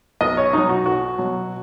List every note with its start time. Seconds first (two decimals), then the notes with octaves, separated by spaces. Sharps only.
0.21 B1 D#5
0.37 C#5
0.53 B2 F#3 D#4
0.69 F#4
0.86 B1 F#4
1.18 B2 F#3